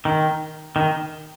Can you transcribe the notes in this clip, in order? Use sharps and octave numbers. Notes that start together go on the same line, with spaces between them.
D#3
D#3